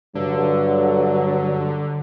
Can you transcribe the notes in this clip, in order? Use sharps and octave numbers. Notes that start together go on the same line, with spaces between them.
G2 D3 F#3